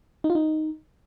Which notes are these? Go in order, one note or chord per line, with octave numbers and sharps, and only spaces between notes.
D#4
F4
D#4